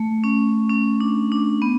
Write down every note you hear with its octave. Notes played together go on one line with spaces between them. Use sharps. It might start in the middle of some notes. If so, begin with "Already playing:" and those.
Already playing: A3
C#4
C#4
D4
D4
B3